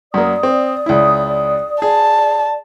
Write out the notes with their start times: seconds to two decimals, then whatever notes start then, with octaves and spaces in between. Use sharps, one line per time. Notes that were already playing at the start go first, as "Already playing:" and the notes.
0.14 F#2 A#3 D5 D#6
0.43 C4
0.86 C#2 E4
1.82 G#4 D5 A5